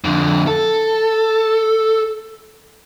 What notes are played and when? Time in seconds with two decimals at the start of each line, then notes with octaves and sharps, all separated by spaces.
0.04 F2 D3
0.47 A4